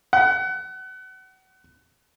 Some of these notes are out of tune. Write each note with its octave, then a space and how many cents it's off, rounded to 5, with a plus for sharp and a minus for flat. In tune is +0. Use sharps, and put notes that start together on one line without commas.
F#5 +30